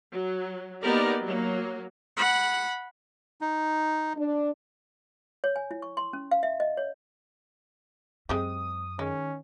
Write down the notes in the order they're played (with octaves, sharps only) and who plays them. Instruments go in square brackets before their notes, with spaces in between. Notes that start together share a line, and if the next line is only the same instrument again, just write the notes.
[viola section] F#3
A#3 B3 D#4 G4 A#4 D5
F#3 A#3
[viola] F#5 B5
[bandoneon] D#4
[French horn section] D4
[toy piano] C#5
G#5
E4
C#6
C6
C#4
F5
E5
D#5
C#5
[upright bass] F#2 [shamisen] G#3 C4 G4 [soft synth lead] D#6
[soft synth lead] D#3 [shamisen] G#3 [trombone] C#4